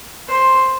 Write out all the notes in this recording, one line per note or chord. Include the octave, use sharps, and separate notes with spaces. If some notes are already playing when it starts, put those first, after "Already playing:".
C5